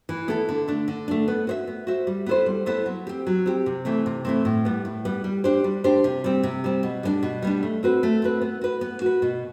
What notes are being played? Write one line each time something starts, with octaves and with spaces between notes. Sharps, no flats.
E3
B3 E4 A4
D3
A3 D4
D3
A3 D4
B3
F#4 C5 E5
B3
F#4 C5 E5
G3
B3 E4 A4 C5
G3
B3 E4 A4 C5
F#3
C4 G4
F#3
C4 G4
C3
E3 A3 C4
C3
E3 A3 C4
A2
G3 B3
A2
G3 B3
G3
D4 G4 C5
G3
D4 G4 C5
C3
G3 C4
C3
G3 C4
B2
G3 B3 D4
B2
G3 B3 D4
A3
C4 F#4 B4
A3
C4 F#4 B4
B3
F#4 B4
B3
F#4 B4
B2